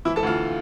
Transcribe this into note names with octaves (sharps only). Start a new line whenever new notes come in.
E3 E4 E5
A4 A5
D2 F4 F5